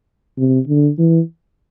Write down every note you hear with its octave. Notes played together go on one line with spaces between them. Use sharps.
C3
D3
E3